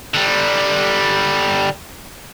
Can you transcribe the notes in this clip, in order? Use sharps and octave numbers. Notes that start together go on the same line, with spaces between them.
D3 G3